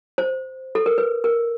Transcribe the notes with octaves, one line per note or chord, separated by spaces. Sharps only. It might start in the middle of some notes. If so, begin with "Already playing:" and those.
C5
A4
A#4
B4
A#4